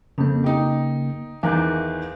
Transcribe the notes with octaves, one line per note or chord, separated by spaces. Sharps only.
F2 C#3 A#3
D#4 G4
E2 D#3 E3 F5 F#6